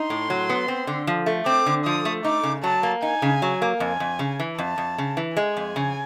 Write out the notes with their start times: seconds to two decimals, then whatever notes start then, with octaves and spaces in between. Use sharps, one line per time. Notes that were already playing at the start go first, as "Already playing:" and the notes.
Already playing: D#4 C6
0.10 A2
0.30 F#3
0.49 B3
0.68 C4
0.87 D3
1.07 F3
1.26 A3
1.46 C4 D6
1.66 D3
1.85 F3 D#6
2.05 A3
2.24 D#4 D6
2.44 C#3
2.64 F#3 A5
2.83 A#3
3.02 D#4 G#5
3.22 C#3
3.42 F#3
3.62 A#3
3.80 F2 G#5
4.00 F2
4.19 C#3
4.40 E3
4.59 F2 A5
4.78 F2
4.98 C#3
5.17 E3
5.37 G#3 G#5
5.57 F2
5.76 C#3